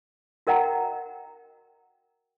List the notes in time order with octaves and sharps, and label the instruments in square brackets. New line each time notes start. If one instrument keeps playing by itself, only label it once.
[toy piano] F#4 A#4 D#5 F#5 G5 A#5